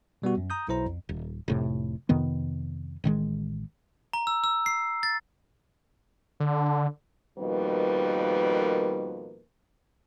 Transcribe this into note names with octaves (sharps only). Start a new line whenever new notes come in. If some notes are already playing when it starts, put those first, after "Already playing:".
B2 G3 B3 F#4
F#2
A#5 D#6 G6
B1 E4 C5 A#5
F2
D#1
F1 A2 C3
F2 C3 D#3 B3
A1 D#3 F#3 G#3
A#5
E6
E6
C7
A6
D3
F2 B2 D#3 G3 A#3 B4